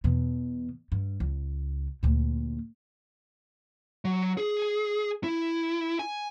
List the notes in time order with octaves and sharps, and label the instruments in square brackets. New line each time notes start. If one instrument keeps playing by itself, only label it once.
[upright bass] E2 B2
G2
C#2
D2 A#2
[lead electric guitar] F#3
G#4
E4
G#5